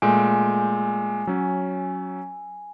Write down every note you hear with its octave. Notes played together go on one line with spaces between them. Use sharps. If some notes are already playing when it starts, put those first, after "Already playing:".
A#2 G#3 A3 G#5
F#3 C#4